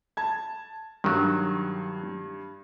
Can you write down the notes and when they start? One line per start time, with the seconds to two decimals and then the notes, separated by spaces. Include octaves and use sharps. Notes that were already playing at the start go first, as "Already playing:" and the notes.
0.17 A5 G#6
1.04 G2 D#3 F#3